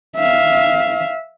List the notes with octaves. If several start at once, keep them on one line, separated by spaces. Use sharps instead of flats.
E5 F5